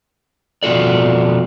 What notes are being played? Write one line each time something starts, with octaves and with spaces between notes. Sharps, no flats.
F2 B2 F4 F#4 A4 D5